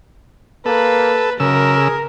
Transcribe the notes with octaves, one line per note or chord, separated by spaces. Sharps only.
A#3 A4 B4
F#2 C#3 A#4 E6
G#4